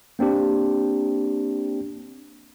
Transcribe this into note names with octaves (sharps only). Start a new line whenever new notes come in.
A#3 C4 D4 G4